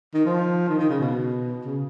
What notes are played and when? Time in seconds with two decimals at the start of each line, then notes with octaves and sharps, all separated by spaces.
0.15 D#3
0.26 F3
0.69 D#3
0.79 D#3
0.90 C#3
1.01 B2
1.65 C#3